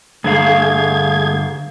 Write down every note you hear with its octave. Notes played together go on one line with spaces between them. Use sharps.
G2 D3 A3 G#4 F5 G#6